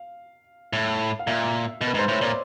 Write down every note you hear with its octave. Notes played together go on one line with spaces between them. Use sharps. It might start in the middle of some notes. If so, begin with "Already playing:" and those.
Already playing: F5
A2
F5
A#2 E5
B2
B4
G#2
C5
A2 C#5
A#2 D5